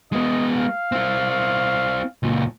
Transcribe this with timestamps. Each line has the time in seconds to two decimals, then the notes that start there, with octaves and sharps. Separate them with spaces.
0.12 G#3 B3 D#5
0.57 F5
0.92 C4 E4
1.31 F5
2.23 C#2 A#2